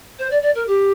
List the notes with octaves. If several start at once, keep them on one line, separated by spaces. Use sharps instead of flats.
C5
D5
D5
A#4
G4